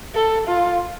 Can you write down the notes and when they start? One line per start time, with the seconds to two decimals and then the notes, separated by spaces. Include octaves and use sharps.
0.15 A4
0.47 F4